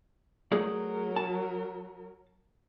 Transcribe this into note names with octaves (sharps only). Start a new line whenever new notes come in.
F#3 A3 G#4 A#4 D5
A5